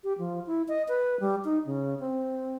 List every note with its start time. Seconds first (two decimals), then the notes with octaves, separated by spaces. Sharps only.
0.04 G4
0.18 F3
0.47 E4
0.68 D#5
0.88 B4
1.20 G3
1.45 D#4
1.66 C#3
2.00 C4